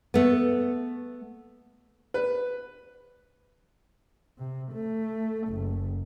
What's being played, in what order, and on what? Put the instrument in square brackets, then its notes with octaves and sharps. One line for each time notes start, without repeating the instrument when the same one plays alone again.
[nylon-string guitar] A3 B3
[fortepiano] B4
[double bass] C3
A3
F#1